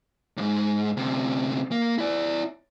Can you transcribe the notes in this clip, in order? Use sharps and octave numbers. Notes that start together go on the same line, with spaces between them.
D#2 G#2
D2 C3
A#3
E4 D5